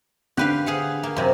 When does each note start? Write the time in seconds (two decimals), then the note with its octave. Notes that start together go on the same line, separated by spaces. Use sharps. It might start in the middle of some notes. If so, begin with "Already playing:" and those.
0.37 D3 G4 B4 F5 F#6
0.66 G#4 F5 F#5
1.03 A#3
1.16 F#2 C3